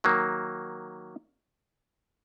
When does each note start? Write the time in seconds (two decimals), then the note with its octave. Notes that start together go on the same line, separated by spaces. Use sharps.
0.04 D#3 F#3 A#3